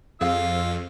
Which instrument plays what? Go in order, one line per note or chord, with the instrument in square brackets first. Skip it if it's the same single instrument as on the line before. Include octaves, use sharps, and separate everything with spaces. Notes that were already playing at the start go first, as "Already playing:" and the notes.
[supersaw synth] F2 [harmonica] F4 E6 [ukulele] G#4 F5